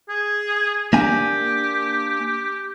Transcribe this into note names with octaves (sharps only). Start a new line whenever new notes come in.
G#4
A#3 D4 G4 G#5